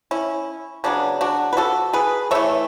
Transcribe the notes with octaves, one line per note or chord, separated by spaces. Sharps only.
C#4 E4
C#3 F#3 B3 D4
D4 F#4
B4
F#4 A4
G#4 B4
E3 A3 C#5 E5